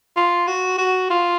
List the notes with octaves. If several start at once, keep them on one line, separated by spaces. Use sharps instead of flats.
F4
F#4
F#4
F4